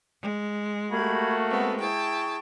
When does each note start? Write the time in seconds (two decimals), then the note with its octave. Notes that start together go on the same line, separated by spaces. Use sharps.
0.21 G#3
0.91 A3 A#3 F#4 G4 B5 G#6
1.48 G#3 B3 C4 A4
1.80 E4 G#4 G5 A5 C#6